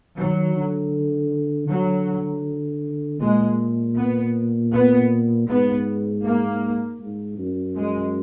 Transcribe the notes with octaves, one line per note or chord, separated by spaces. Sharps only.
D#3 F#3
D3
D3 F#3
A#2 G#3
B3
B3
G#2 B3
A#3
G#2
F#2
G#3